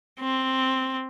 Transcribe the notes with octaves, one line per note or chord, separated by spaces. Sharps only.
C4